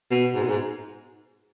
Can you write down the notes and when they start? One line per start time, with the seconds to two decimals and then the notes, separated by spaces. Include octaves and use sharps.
0.11 B2
0.34 G#2
0.43 B2
0.49 G#2